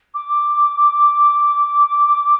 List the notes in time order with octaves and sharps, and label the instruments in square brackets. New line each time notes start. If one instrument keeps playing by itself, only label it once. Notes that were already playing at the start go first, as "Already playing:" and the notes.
[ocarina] D6